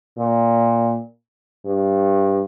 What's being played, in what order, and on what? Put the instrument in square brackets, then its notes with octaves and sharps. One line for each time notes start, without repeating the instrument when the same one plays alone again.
[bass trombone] A#2
G2